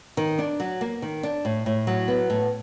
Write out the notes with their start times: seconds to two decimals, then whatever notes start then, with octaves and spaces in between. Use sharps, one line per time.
0.17 D#3
0.38 D4
0.60 F#3
0.81 A#3
1.02 D#3
1.23 D4
1.45 A2
1.66 A2
1.87 F#3
2.08 B3
2.30 A2